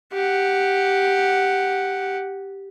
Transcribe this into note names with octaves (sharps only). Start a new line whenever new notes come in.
G4 F#5